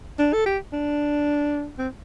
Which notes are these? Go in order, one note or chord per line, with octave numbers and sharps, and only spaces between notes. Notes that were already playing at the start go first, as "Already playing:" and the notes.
D4
A4
G4
D4
C4